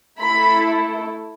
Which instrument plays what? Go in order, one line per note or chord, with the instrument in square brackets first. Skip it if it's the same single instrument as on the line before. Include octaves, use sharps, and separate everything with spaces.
[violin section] A3 E4 A4 B5